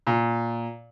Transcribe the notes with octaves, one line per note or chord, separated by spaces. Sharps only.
A#2